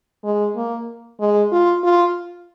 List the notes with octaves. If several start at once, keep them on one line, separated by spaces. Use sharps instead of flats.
G#3
A#3
G#3
F4
F4